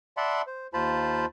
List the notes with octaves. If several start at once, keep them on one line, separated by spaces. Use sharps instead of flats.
D5 E5 F#5 A5 B5 C6
C5
D#2 F4 C5 A5 B5